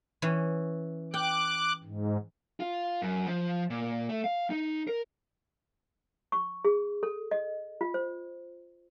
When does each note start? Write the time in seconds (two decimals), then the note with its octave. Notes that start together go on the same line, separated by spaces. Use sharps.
0.22 E3 C#4
1.14 G5 D6 F#6
1.84 G#2
2.60 F4
3.02 F#2
3.27 F3
3.70 A#2
4.09 A3
4.24 F5
4.50 D#4
4.87 A#4
6.32 C#6
6.65 G#4
7.03 A4
7.31 D#5
7.81 F4
7.94 C5